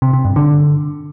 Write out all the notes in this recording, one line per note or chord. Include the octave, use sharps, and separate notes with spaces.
C3
C3
G2
D3